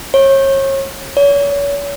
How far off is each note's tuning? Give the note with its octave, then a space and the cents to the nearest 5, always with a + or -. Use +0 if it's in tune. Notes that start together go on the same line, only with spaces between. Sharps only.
C#5 -35
C#5 +35